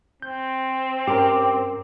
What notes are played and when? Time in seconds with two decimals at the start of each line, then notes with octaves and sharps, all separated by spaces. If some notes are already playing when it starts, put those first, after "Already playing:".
0.22 C4 G6
1.07 G2 C#4 G4 A#4